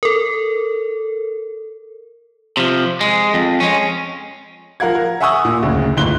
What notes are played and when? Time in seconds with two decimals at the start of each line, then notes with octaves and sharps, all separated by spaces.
0.03 A4 A#4
2.57 C3 F3
3.01 G#3
3.34 F2
3.60 G#3 C#4
4.80 F3 A#4 F5 F#5 G#6
4.95 A#4
5.21 E5 F#5 G#5 C#6 D#6 E6
5.45 A#2
5.63 F#1 D2 C#3
5.97 G1 C#2 A2 C6 F#6 G7